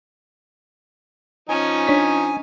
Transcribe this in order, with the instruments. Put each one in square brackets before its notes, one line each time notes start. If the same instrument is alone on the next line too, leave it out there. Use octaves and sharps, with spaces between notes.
[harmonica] F3 D#4 D#6 [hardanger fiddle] C#4 [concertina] G#5
[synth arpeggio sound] D4 C#5 B6